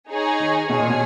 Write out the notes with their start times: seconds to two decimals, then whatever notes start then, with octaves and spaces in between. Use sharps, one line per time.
0.11 D#4 G#4 C#5 G#5
0.40 D#3
0.69 B2 G#4 C#5 G#5
0.80 A#2
0.90 B2